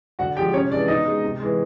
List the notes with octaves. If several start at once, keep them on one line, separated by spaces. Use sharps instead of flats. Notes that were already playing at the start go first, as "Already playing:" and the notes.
D3 F#4 F#5
F3 G#3 G4 G5
C3 C#4 C#5
E3 G#3 D4 D5
B2 D#4 D#5
G#3
C3
E3 G#3